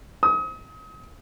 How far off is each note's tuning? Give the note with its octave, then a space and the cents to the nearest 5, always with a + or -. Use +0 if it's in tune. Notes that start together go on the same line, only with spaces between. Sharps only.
D#6 +35